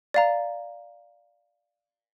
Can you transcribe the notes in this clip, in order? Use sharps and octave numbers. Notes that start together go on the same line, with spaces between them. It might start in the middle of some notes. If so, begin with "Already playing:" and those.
D5 F5 A#5